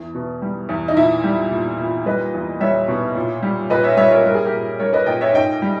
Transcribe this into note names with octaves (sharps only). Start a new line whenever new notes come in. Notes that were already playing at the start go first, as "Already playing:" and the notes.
Already playing: E2 E3
B2
G3
E2
D#4
A#2 E4
G3
A#2
A#2
G3 B4 D#5
E2
G3 C#5 E5
B2
A#2
G3
A#2 B4 D#5
C#5 E5
G3 C#5 E5
A#4 C#5
G3 A#4
G#4
G4 A#4
A#2
G3 A#4 C#5
B4 D#5
A#2 D#5 G5
C#5 E5
G#2 D#5 G5
G3